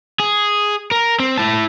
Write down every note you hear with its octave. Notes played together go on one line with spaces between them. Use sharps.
G#4
A#4
C4
E4 A5